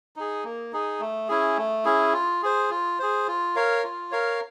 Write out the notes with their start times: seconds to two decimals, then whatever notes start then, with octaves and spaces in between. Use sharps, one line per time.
0.16 D#4 G#4
0.44 A#3
0.73 D#4 G#4
1.00 A3
1.29 C#4 E4 G#4
1.57 A3
1.85 C#4 E4 G#4
2.13 F4
2.43 G#4 C5
2.70 F4
2.99 G#4 C5
3.28 F4
3.56 A#4 C#5 F5
3.84 F4
4.12 A#4 C#5 F5